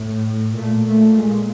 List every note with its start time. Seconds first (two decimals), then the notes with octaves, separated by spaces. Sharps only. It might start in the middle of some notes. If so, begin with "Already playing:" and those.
Already playing: A2
0.57 A#2 A3
0.87 A3
1.17 G#3